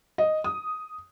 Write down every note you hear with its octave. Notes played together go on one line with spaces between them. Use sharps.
D#5
D#6